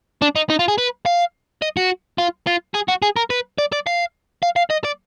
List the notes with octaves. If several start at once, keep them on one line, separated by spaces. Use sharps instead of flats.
D4
D#4
D#4
F4
G#4
B4
F5
D#5
F#4
F4
F4
G#4
F#4
G#4
A#4
B4
D5
D5
F5
F5
F5
D#5
D5